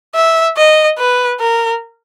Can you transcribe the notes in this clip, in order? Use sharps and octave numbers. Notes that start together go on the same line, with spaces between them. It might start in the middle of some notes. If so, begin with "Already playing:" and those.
E5
D#5
B4
A#4